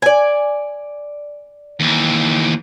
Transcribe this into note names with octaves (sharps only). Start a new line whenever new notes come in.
D5 G#5
D#2 E3